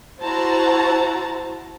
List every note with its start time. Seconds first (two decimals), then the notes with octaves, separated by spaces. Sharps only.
0.21 E4 F#4 C5 A5 A#5